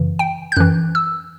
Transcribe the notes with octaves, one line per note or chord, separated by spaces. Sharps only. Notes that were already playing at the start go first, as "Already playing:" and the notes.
Already playing: F#2 C#3 E3
G5
G6
F#2 E3 F#6
E6